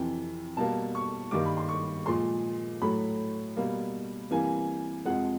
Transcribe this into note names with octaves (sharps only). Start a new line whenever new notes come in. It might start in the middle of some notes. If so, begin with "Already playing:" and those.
Already playing: F2 C3 E3 G5
B2 G3 A#3 A5
C#6
G2 D#3 G3 A#3 D6
B5
C6
C#6
A#2 F3 G#3 C6
A2 F#3 A3 B5
B2 G3 A#3
C3 E3 G3 A#3 G#5
F2 C3 F3 G#3 F#5